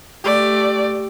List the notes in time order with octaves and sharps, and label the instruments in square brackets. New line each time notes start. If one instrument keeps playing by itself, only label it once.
[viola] A3 D5 [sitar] G4